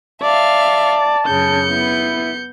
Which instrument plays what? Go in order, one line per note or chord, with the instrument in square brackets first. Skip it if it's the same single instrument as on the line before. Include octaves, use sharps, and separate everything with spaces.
[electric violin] D5 [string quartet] E5 F5 [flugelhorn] A5
[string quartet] F#2 C#3 [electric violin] G6 C#7
[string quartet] B3 [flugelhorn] E4